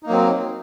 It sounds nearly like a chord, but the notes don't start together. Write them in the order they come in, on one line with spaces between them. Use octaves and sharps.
D#4 A#3 F#3 C4